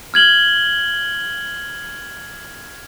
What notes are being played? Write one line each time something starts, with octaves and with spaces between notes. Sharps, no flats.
F6 G#6 F#7 G7